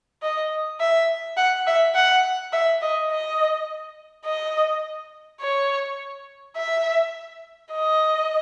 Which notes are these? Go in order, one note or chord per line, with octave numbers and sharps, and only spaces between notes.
D#5
E5
F#5
E5
F#5
E5
D#5
D#5
D#5
C#5
E5
D#5